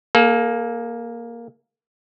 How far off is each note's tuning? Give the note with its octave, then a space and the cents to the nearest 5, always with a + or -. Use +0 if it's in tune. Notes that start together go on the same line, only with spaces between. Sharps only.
A#3 +5 A4 -40